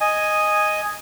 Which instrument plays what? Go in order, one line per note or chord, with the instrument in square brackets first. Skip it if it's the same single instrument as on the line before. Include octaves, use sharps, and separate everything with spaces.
[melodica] D#5 G#5